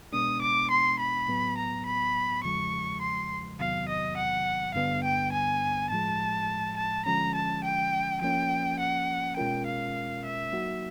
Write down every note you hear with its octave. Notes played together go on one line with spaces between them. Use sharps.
B2 G#3 B3 D4 D#6
D6
C6
B5
A2 F#3 B3
A#5
B5
E2 C#3 F3 G#3 C#6
C6
E2 C3 D#3 F#3 B3 F5
D#5
F#5
G2 D3 G3 B3 D4 F5
G5
G#5
A2 F3 G#3 A5
A5
D3 F3 G#3 C#4 A#5
A5
G5
F3 A#3 C#4 G5
F#5
B2 G#3 C#4 F4 A#4 G5
F5
E5
F#3 A#3 D#4 F#4